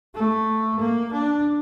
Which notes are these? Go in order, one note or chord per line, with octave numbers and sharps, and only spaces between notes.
A3
A#3
D4